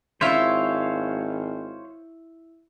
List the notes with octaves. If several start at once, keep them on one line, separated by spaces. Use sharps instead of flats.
G#1 E4 F4 C5 C#5 E5 F5